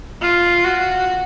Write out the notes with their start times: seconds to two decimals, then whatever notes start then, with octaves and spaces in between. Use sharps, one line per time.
0.22 F4
0.64 F#4